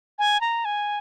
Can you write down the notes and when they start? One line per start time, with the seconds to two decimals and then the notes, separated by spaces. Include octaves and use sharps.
0.19 G#5
0.41 A#5
0.65 G#5